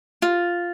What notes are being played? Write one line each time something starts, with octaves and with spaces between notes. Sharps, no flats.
F4